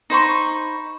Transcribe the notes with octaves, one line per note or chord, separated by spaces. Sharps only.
D#4 C5 B5 C#6